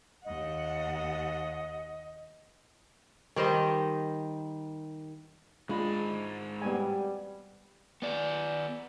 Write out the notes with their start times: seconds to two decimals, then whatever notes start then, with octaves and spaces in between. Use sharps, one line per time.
0.24 D#2 D#5 F#5
3.36 D#3 G3 C5 D#5
5.69 G#2 G#3 D4 F4 G#4 B5
6.62 G3 B3 C4 G#5
8.02 B3 D5